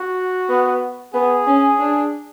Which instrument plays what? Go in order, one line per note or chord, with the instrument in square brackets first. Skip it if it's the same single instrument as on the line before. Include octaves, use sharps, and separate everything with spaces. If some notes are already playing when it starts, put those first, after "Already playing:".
Already playing: [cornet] F#4
[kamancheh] B3
[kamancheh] B3 [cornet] G#4
[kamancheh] C#4
D4